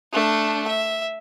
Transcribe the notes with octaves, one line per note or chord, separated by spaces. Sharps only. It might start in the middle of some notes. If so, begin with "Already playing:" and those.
A3 D4
E5